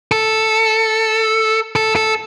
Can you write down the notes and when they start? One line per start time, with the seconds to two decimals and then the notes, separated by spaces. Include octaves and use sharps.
0.12 A4
1.76 A4
1.96 A4